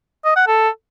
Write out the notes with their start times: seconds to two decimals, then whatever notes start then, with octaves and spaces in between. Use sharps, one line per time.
0.25 D#5
0.36 F#5
0.47 A4